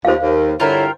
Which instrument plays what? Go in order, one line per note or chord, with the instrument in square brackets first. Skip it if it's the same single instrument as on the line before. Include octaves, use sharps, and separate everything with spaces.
[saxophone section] D#2 [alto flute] F4 [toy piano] C5 F5
[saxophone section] D#2 [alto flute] A#4
[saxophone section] G2 D3 E4 [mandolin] F4 G4 A#4 [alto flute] C#5